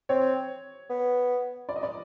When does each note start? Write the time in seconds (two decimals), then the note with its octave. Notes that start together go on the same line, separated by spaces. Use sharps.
0.09 C4 C#5
0.90 B3
1.69 D5
1.76 D#5
1.83 D5